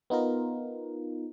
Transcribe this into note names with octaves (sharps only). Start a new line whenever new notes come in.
B3 D#4 F4 A#4